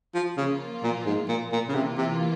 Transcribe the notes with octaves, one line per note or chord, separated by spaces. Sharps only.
F3
C#3 F3 A#3 F4
A#2
G#2
A#2
A#2
C#3
C3 E3 A#3 F4
C3